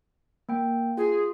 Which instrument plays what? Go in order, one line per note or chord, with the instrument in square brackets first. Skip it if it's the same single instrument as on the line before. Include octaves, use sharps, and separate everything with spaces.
[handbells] A#3 G5
[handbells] F4 [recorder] G#4